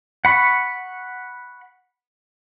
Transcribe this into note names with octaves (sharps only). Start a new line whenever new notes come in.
F#5 B5 C#6